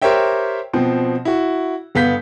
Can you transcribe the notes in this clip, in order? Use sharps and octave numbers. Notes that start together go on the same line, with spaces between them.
G4 A#4 C5 C#5 E5 G5
B2 F3 C4
E4 F#4
G1 B3 F5 G6 B6